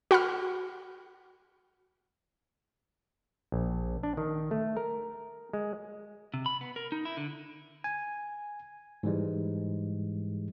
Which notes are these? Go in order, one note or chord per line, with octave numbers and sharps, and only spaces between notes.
F#4 F#5 B5 F6
A#1
D4
D#3
A3
A#4
G#3
C3
B5
B3
A#4
D#4
E4
D3
G#5
G#2 E3 G3 G#3